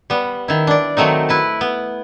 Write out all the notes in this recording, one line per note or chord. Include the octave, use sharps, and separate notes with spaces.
G3 B3
D#3 E4
D4 D5
D#3 F#3 A3 C4 D#4
E4 B4 A5
B3